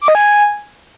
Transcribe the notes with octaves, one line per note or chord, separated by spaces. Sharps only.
D6
D#5
G#5